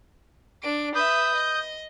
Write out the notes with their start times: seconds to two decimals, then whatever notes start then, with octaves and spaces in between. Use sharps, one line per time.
0.63 D4 D7
0.95 B4 E5 D#6 G6
1.35 D#5